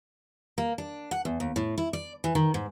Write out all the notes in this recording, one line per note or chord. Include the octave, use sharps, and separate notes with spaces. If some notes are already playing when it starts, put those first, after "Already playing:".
A#3
D4
F#5
E2
D#2
A2
E4
D5
E3
D#3
G#2